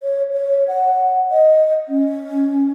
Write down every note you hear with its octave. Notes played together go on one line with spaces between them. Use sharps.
C#5
C#5
F#5
D#5
C#4